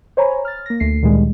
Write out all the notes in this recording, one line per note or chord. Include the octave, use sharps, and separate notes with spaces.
C5 C#5 G#5 A#5 B5
F6 A6
A#3 A#6
D2 A3 C7
D2 A#2 D#3 G3 G#3